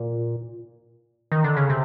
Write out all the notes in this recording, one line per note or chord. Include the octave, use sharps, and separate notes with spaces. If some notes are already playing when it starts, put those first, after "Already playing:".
Already playing: A#2
D#3
D3
C#3
C3